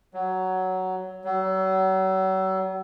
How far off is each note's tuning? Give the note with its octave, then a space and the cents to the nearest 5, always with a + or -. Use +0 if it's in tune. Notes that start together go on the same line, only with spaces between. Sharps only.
F#3 +10
F#3 +40